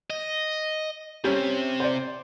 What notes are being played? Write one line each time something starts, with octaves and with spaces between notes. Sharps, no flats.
D#5
C3 G3 C#4
C5 D5